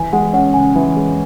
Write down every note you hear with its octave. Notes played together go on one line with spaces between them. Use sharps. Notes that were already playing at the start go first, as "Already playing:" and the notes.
Already playing: E3 G#5
G#3 F#5
C#4 F#5
C#3 G#5
E3
G#3